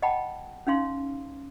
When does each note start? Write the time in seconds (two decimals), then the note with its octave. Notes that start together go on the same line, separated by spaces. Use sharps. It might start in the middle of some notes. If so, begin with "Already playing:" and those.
0.02 D#5 F#5 G5 A5 B5
0.67 C#4 D#4 F5 C6